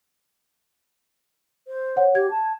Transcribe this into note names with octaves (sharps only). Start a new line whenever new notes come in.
C5
C#5 F#5
G4 G#6
A5